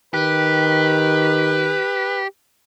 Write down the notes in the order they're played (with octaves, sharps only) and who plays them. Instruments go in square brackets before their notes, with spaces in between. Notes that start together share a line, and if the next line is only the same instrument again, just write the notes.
[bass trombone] D#3 [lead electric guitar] G4 [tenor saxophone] B4